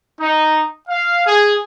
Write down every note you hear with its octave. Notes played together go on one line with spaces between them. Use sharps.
D#4
F5
G#4